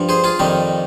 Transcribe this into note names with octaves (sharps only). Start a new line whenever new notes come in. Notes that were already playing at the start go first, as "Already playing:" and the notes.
Already playing: G2 F3
G#4 C5
F4 G#4
F2 D#3 G3 D#4